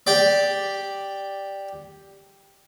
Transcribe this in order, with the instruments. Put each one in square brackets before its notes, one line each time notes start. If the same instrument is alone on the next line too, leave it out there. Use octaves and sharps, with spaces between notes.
[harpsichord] G4 D5